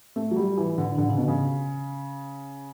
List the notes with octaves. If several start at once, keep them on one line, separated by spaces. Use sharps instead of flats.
A3
F#3
G3
E3
D3
D3
C#3
B2
C#3